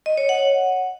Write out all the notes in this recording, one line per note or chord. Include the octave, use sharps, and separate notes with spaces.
D#5
C#5
F#5